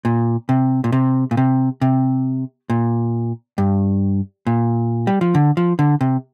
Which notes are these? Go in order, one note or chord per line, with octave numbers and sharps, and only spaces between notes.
A#2
C3
A#2
C3
A#2
C3
C3
A#2
G2
A#2
G3
F3
D3
F3
D3
C3